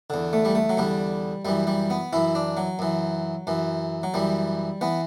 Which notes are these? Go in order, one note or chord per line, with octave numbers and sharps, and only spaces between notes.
E2 D3
A3
G3
A3
F#3
E2 D3 G3
F#2 E3 G3
G3
B3
F#2 E3 E4
D4
F#3
F#2 E3
F#2 E3
F#3
F#2 E3 G3
E3 B3